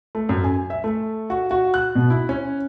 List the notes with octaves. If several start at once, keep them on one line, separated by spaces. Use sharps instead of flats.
A3
F#2
G#5
E5
A3
F#4
F#4
F#6
B2
E4
C#4